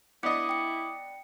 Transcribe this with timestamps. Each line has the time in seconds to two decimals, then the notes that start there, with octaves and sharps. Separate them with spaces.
0.23 B3 D4 E4 D#5 D6 D#6 C#7
0.49 G5 C#7